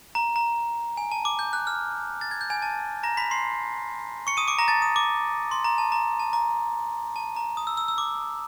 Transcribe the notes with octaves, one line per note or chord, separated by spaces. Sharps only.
A#5
A#5
G#5
A5
D6
G6
F#6
F6
A6
G#6
G6
G#5 G#6
A5 A6
A#5 A#6
B5 B6
C6 C7
C#6 C#7
D#6 D#7
D6 D7
A#5 A#6
A5 A6
D#6
D6
C6
A#5
A5
A#5
A5
A#5
A5
A#5
D#6
E6
E6
E6
D6